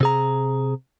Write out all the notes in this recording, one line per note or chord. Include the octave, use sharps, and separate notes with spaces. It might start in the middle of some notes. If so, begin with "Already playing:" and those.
C3 G#4 A#5